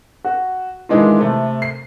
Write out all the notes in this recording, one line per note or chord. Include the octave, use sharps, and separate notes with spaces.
F#4
D#3 E3 G#3 D4 F4
C3 A3
C7